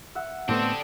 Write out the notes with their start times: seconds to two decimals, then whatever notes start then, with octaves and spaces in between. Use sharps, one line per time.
0.15 E5 F#5
0.49 A2 A3 B3 C4 D4 G4 A4 D#5